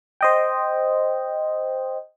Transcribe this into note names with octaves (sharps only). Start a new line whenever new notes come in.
C5 D#5 G5